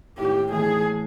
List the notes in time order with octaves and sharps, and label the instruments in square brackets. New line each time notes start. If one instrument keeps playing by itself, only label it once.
[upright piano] A2 [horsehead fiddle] G4
[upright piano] E3 A3 [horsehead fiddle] G#4